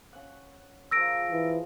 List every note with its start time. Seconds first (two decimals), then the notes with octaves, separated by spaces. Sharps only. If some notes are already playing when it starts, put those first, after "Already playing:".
0.13 C#4 F#5
0.91 F3 G#4 A#4 E6 A#6 D7
1.32 E3